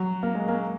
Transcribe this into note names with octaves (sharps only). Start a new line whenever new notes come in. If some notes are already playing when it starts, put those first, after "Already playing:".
Already playing: F#3
A#3
G#3
A#3